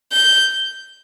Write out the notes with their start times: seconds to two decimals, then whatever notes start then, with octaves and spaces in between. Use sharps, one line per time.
0.12 G6